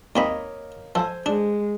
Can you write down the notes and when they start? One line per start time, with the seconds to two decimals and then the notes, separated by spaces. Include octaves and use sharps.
0.16 D#2 A#3 C4 C#5 D#5 B5
0.95 F3 A4 C5 G#5
1.26 G#3 D4